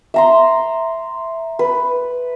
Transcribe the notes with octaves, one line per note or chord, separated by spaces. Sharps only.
E5 A#5 C6
B4